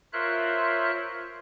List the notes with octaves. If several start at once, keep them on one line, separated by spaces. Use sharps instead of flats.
F4 A#4 C5 C#5 E5 F#6